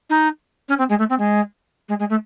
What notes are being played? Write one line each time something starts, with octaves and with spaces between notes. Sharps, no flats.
D#4
C#4
C4
G#3
A3
C4
G#3
G#3
G#3
A3